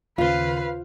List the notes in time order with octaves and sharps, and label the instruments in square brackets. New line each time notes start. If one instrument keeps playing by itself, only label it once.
[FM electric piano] D#2 C#3 [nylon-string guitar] F4 C5 [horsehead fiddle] B4 F5